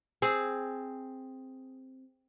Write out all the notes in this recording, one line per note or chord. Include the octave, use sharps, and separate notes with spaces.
C4 G#4